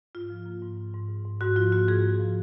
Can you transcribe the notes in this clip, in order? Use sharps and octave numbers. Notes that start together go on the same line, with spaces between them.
G#2 F4
F3
A#3
G#2
G#2
G#2
G#2
G#2
G#2 F#4
F3 F4
A#3 F#4
G#2 G#4
G#2
F3